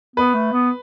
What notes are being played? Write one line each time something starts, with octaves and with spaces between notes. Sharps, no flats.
B3 B4
A3
B3